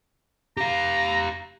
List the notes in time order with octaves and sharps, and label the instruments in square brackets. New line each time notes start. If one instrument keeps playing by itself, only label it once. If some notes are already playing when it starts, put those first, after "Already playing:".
[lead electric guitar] G4 F5 [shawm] A#5